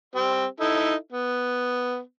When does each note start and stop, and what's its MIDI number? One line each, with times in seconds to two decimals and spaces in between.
0.15 0.45 55
0.15 0.45 60
0.15 0.45 67
0.60 0.94 63
0.60 0.94 64
0.60 0.94 69
1.12 2.00 59